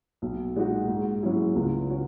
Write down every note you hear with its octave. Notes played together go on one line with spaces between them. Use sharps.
B1
A#2 G#3 D#4 F#4
G#2
F#3 C#4 E4 G#4
C#2
C#4 F#4